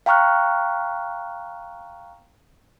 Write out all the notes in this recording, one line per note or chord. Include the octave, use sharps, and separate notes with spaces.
F5 G5 A#5 C#6 F6 F#6